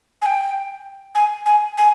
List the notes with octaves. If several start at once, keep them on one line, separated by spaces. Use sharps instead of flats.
G#5
G5
G#5
G#5
G#5